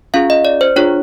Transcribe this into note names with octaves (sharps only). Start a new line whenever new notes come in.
C#4 F4 G#4 F5
D#5
D5
C5
D4 F4 G#4 C#5